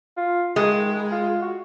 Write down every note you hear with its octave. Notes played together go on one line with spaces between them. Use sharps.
F4
D#3 G#3
F4
F#4